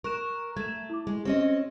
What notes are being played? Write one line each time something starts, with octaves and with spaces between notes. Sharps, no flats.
A#4 C#6 F#6 E7
A3 G#6 E7
E4 D6
G#3
C4 C#4 G4 D#5